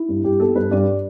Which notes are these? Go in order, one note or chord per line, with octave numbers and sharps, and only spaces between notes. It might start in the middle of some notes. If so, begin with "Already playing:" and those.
Already playing: E4
G2
G2 G4
B3 A4
G2 B4
G2 D5